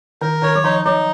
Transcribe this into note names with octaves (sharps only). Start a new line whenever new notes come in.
D#3 A#4
D#3 C#5
F#3
F3 D#4
F#3 D#4